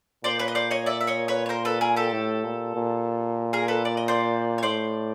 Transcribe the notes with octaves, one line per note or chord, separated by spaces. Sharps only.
A#2 C5 D5
B4 C#5
D#5
C5 D5
C#5 D#5
D5 E5
E5
C#5 D#5
B4 C#5
C#5
A#4 C5
A4 B4
G#4 A#4
G4 A4
A2
A#2
A#2
G#4 A#4
A4 B4
D5
D#5
C5 D5
C#5
A2 C5 D5